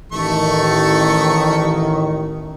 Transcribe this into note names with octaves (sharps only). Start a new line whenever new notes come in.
A1 D#3 A3 A4 C#6